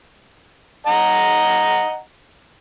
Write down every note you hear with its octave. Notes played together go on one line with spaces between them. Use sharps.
D#5 F#5 A#5